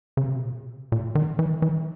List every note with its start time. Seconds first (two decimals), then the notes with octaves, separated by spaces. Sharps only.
0.17 C#3
0.26 C3
0.36 B2
0.45 A#2
0.92 A#2
1.15 D#3
1.39 E3
1.62 E3